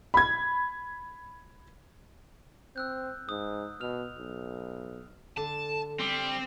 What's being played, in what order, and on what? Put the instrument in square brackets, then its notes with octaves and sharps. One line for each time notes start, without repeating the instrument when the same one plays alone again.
[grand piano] B5 G#6
[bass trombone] C4 [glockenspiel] E6 F#6 G6
[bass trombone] G#2 [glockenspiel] D#6
[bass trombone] B2 [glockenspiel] F6 F7
[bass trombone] B1
[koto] D3 [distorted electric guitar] A5
[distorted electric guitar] G3 [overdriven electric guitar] C4